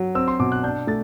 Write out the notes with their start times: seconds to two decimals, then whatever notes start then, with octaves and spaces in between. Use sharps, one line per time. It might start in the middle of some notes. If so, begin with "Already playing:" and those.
Already playing: F#3
0.15 C4 E6
0.28 C6
0.39 B2 D6
0.52 F#6
0.63 D4 G6
0.87 A3 A6